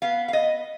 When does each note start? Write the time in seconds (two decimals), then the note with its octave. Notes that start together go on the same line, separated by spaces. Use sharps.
0.02 B3 F5
0.28 F5
0.33 B3 D#5